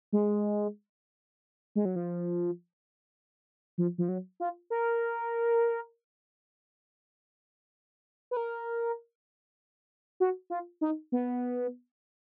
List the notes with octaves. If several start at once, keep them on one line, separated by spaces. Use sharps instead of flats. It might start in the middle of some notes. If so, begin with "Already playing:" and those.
G#3
G#3
F#3
F3
F3
F3
F#3
F4
A#4
B4
A#4
F#4
F4
D#4
B3